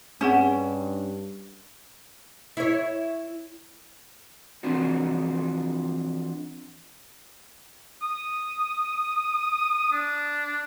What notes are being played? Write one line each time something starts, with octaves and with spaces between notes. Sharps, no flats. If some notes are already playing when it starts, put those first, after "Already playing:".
G2 C4 C#4 G#4 F#5
E4 C#5
E3 F3 C4 D4 F#4
D#6
D4